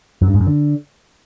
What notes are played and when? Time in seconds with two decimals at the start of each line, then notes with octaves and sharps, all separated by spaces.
0.22 F#2
0.28 G2
0.34 G#2
0.41 F#2
0.47 D3